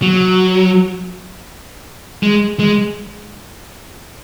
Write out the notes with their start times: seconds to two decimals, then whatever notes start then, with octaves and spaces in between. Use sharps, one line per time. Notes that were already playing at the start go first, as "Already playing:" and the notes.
0.02 F#3
2.23 G#3
2.60 G#3